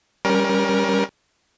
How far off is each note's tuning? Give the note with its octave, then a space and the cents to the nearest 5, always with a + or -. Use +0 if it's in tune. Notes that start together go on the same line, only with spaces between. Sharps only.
G3 +0 C#4 +0 A#4 +25